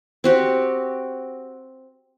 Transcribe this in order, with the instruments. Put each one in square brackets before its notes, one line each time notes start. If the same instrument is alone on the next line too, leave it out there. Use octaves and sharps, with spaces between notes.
[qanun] C4 F#4 G4